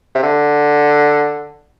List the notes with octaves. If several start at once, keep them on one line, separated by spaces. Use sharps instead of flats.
C3
D3